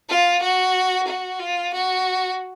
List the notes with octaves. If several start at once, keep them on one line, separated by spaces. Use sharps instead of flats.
F4
F#4
F#4
F4
F#4